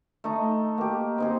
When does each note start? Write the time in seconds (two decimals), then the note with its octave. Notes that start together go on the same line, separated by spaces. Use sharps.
0.24 A3 D#4 D#5
0.78 A#3 G4
1.18 C4 D#4 G#4